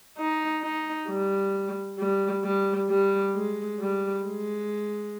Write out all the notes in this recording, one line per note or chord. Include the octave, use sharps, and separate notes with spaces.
D#4
D#4
G3
G3
G3
G3
G#3
G3
G#3